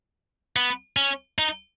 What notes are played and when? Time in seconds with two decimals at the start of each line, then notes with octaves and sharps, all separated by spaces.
0.56 B3
0.97 C#4
1.39 D#4